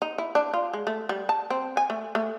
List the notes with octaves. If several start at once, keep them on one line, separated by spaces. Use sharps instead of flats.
D#4
E4
D4
F4
G#3
A3
G3
A5
C4
G#5
A3
A3